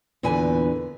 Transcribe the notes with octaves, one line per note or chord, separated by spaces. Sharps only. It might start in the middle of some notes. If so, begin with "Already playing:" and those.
E2 A#2 D3 B4 G#5